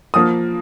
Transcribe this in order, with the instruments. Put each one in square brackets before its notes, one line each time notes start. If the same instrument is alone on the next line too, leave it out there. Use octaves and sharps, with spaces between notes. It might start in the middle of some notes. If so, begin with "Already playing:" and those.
[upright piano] F3 A#3 D#6